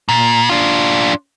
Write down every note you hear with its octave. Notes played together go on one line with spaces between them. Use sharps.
A#2
D4 F4